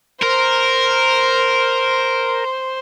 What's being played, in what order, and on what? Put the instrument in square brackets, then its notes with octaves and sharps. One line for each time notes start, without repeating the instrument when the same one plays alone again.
[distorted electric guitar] A#4 [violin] C5